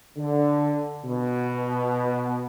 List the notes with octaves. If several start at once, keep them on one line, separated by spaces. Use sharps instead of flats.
D3
B2